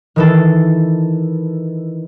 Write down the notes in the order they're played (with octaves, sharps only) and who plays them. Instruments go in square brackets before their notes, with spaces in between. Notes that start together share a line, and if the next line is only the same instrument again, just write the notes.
[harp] D#3 E3 A4